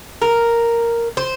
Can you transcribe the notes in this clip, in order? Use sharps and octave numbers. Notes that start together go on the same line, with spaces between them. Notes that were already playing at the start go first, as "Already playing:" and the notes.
A#4
C5